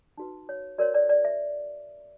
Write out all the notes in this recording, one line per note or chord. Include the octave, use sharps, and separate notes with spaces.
D#4 F#4 B4
C#5
F#4 A#4 C#5 D5
D5
D5
E5